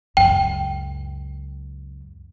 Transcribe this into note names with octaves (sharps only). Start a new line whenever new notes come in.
C#2 F#2 G5